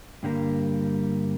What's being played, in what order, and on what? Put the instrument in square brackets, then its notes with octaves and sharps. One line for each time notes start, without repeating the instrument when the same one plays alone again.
[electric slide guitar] G2 D3 G3 A#3